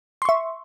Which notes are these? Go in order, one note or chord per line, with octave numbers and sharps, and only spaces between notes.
E5 C6 C#6